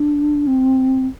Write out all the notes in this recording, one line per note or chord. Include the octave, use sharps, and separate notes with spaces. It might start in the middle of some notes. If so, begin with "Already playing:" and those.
Already playing: D4
C4